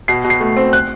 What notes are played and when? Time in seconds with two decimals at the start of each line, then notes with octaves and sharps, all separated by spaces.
0.08 B2 C7
0.24 B2
0.30 C7
0.40 A3
0.57 C4
0.73 F#6